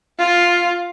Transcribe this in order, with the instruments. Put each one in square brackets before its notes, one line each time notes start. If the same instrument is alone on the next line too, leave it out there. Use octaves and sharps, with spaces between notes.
[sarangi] F4